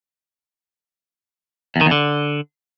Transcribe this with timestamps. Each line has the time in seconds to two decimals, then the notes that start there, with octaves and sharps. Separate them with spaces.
1.76 E2
1.81 D#3
1.86 E2
1.91 D3